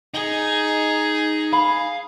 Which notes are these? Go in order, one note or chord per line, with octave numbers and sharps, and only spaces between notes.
D#4 G#4
F5 B5